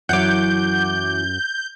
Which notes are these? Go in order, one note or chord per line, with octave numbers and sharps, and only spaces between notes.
F#2 E3 F#3 F#5 D6 G6